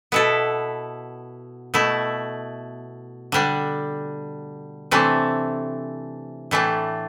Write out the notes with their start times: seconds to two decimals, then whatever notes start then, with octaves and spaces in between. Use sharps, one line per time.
0.12 B2 B3 E4 A4
1.74 B2 A3 E4
3.32 D3 G3 D4
4.91 C3 E3 A3 D4
6.51 A2 E3 A3 D4